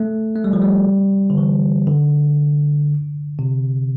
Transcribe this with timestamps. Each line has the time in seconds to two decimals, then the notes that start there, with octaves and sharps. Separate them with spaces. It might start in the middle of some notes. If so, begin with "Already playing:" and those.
Already playing: A3
0.36 A3
0.44 G3
0.53 F3
0.62 G3
1.30 D3
1.37 E3
1.87 D3
3.39 C3